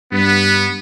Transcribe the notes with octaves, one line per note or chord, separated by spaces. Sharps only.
G2 B3